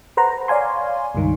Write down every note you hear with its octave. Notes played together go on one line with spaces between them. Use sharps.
B4 C5 F#5 A#5
C#5 D5 F5 G#5 C6
C#2 G2 D#3